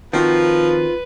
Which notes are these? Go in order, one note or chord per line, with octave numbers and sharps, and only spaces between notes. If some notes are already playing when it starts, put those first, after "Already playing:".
D#3 F3 C4 F4 F#4 B4